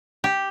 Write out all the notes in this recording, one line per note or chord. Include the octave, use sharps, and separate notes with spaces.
G4